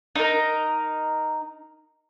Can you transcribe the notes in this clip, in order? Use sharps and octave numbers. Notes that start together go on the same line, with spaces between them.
D#4 A#4